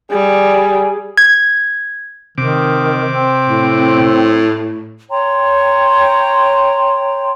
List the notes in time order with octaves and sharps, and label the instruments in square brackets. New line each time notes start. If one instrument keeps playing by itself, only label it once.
[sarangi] G3 [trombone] G#4
[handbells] G#6
[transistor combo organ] C3 D6 [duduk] D#3
[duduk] C4
[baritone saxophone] A2
[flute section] C#5 G5 A#5 C6